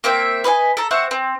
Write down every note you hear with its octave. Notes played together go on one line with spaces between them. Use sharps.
A#3 C4 E5 G5
B4 D#5 E5 G#5
A4 A#5
C4 E5 F#5 C#6
C4